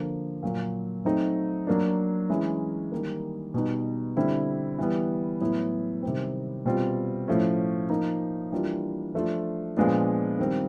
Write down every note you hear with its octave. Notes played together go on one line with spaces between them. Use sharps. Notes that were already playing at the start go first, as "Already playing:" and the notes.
Already playing: D3 F3 A#3
A#2 F#3 A#3
F#3 A3 C4 D#4
F#3 A#3 D4
E3 G#3 C#4 E4
D#3 G3 A#3
B2 G3 B3 D#4
D3 G3 C4 E4
E3 G3 B3
A2 F#3 B3 E4
C3 D#3 G3 C4
B2 G3 C4 F4
A2 F3 A3 C#4
F3 A#3 D#4
E3 G3 A#3 D4 F4
F3 A3 D4 F4
A#2 F3 G#3 B3 D4
D#3 G3 C4